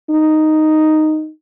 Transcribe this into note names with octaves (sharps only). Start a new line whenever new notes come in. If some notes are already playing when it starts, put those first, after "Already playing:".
D#4